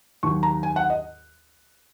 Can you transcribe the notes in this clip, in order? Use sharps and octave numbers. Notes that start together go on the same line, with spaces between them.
D#2 D#3 F#3 C#6
A#5
G#5
F#5
D#5